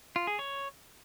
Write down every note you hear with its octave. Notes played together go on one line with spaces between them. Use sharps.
F4
G#4
C#5